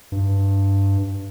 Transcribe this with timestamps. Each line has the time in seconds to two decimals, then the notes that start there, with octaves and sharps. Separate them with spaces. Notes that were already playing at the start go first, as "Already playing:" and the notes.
0.12 G2